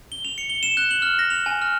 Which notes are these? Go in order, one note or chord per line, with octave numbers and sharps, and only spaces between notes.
G7
F7
C#7
G7
E7
F#6
F#7
F6
A#6
F7
G#5
F6